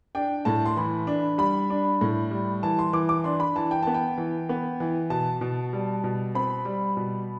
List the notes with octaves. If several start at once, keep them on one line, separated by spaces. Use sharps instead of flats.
D4 G5
A2 A5
C6
E3 B5
D4
G3 B5
D4
A2
G3
E3 A5
C6
E3 D6
D6
D4 C6
B5
E3 A5
G5
B3 A5
G5
E3
B3
E3
B2 A5
B2
G3
B2
C4 B5
G3
B2